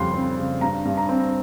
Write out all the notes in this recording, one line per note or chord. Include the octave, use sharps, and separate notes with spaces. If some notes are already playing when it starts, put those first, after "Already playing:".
Already playing: F2 C#3 G3 C6
C4
C#3
G2 A#5
G2
A#5
C4